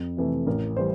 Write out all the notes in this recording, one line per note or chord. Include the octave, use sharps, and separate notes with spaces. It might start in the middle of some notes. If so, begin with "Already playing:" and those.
Already playing: F2
C3 E3 A3
A1 A#4
E3 G3 C5